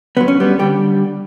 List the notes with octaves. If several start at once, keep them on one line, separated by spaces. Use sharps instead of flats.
D2 D3 F#3 B3
C#4
G3 B3
D3 G3 G4